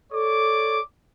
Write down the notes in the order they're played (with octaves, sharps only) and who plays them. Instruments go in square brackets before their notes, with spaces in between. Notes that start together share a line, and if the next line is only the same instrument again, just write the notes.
[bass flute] A4 [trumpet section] C#5 D5 D6